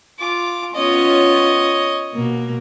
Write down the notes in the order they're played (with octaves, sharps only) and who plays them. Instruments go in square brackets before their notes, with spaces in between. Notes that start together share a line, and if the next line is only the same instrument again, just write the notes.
[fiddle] F4 D6
[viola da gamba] B3 C#4 F4 [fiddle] C#5 D#5
[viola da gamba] B2 A#3